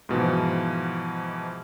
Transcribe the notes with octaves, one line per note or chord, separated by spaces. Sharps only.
G#2 B2 E3 F3